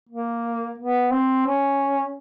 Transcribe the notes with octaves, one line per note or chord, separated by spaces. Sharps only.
A#3
B3
C4
C#4